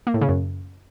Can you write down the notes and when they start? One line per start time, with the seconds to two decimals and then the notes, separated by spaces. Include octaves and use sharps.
0.07 A#3
0.14 A2
0.21 C#3
0.29 F#2